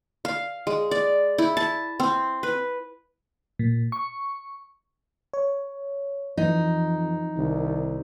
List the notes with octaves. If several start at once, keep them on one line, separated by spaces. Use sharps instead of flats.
F5
G#3
D5
E4
A5
C4
B4
A#2
C#6
C#5
F2 E3 D#4
C2 D#3